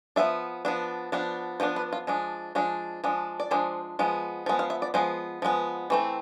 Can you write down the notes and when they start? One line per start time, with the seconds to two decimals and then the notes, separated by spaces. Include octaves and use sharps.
0.16 F3 B3 D4 E5
0.65 F3 B3 D4
1.12 F3 B3 D4
1.60 F3 B3 D4 C5
1.76 B4
1.93 F4
2.07 F3 G#3 D4
2.55 F3 G#3 D4
3.04 F3 G#3 D4
3.40 D5
3.51 F3 G#3 D4 C5
3.99 F3 G#3 B3
4.46 F3 G#3 B3
4.59 F5
4.70 E5
4.82 D5
4.94 F3 G#3 B3 C5
5.42 F3 G#3 B3
5.90 E3 A3 C4